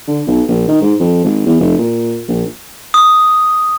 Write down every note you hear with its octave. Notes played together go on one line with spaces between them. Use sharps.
D3
B1
A#1
D#3
G#2
F2
G#1
E2
F1
A#2
A#1
D#6